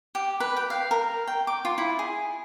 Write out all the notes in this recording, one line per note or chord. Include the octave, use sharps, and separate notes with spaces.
G4
B4
G5
F5
A#4
G5
D6
F4
E4
G#4